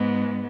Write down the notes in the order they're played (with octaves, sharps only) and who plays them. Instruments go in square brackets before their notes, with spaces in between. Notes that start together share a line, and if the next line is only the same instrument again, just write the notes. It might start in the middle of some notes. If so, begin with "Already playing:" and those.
Already playing: [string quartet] G#2 G#3 B3